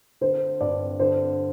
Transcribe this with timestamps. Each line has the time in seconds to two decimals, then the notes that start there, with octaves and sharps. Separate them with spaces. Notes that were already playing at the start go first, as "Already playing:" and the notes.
0.21 D3 C5
0.61 G2 D5
0.99 D3 C5